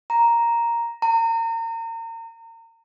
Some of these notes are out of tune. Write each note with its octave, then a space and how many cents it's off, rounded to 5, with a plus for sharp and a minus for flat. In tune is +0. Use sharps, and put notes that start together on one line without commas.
A#5 +0
A#5 -35